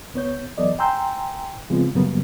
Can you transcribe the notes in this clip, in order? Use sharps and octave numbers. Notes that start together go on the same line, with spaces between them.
C#2 B3 C#5 G6
E2 F#3 B3 A4 D5 D#5
G5 G#5 A#5 C6 E6 G6
C#3 F3 G#3 B3 C4 F4
F#2 C#3 F#3 G3 A#3 B3